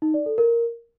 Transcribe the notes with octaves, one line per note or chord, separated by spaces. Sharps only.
D#4
D5
A4
A#4